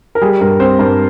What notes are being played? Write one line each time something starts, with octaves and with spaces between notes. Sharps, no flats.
A#4
G3 G#4
G2 A#4
C4 C5
G2 A#4